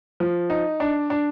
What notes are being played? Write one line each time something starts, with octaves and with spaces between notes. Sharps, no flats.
F3
D#4
D4
D4